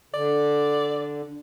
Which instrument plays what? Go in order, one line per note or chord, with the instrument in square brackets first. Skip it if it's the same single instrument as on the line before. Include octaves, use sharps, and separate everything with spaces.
[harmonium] D3 [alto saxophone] D5